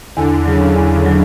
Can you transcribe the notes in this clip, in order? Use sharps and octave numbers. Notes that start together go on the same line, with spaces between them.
E2 D3
C#3 F#3
E2
F#3